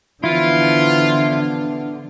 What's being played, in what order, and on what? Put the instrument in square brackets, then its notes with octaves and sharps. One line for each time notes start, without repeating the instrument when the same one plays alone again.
[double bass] D3 [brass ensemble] E3 F3 B3 [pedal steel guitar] E4 [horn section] F4